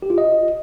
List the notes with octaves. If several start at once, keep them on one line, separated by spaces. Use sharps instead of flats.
G4
F4
D#5